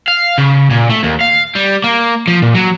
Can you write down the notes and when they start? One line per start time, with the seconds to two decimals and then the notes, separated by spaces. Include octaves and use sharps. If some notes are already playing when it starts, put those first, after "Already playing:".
0.08 F5
0.38 C#3
0.70 A#2
0.89 A3
1.03 D#2
1.21 F5
1.55 G3
1.84 A#3
2.28 F3
2.42 A#2
2.55 F#3